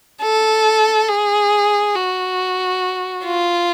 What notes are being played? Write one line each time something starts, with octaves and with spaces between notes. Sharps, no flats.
A4
G#4
F#4
F4